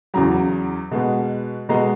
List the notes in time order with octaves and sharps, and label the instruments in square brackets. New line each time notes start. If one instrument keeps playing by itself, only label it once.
[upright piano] E2 C#3 F#3 A#5
B2 G#3 B3
B2 G#3 B3 A#5